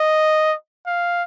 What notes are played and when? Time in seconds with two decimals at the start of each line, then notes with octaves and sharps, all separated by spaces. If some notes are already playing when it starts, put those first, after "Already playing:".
Already playing: D#5
0.86 F5